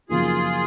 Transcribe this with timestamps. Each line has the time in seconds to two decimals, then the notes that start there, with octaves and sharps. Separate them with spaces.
0.09 F#2 C#3 F3 A#3 D#4 F4 G#4